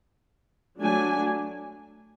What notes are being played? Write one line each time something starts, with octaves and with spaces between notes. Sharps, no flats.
F#3 A3 D4 G#5